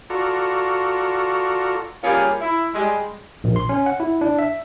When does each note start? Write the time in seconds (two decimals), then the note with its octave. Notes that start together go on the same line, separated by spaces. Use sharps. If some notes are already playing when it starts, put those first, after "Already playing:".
0.10 F4 F#4 A4 D5 A#5 C#6
2.03 G3 A#3 C#4 F4 G#4
2.41 E4
2.74 G3 G#3
3.44 A#1
3.56 C6
3.69 C#4
3.86 F#5
4.00 E4
4.21 D4
4.39 E5